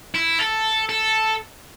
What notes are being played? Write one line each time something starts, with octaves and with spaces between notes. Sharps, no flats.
E4
A4
A4